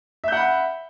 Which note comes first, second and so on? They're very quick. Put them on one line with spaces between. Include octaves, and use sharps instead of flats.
E5 G6 F#5 B5